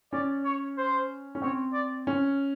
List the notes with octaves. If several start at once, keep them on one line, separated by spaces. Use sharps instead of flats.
C#4 D5
C#5
C5
C#4
C4 C#5
D5
C#4